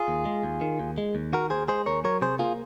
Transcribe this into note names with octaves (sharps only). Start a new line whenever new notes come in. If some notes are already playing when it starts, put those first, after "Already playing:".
Already playing: F4 G#4
D#2
G#3
D#2
D#3
D#2
G#3
D#2
D#3 F#4 A#4
D#2 G#4 C5
G#3 G#4 C5
D#2 A#4 C#5
F#3 A#4 C#5
C3 G#4 C5
A#3 F4 G#4